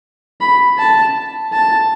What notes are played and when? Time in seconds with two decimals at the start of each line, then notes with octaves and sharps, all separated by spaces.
0.41 B5
0.78 A5
1.53 A5